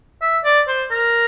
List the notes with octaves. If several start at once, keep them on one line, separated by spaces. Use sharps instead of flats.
E5
D5
C5
A#4